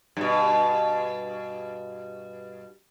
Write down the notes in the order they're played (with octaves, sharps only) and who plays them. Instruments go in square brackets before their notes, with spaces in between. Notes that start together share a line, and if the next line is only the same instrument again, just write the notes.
[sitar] G2 B2